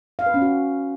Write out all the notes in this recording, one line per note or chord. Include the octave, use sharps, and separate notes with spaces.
F5
B4
C#4
F#4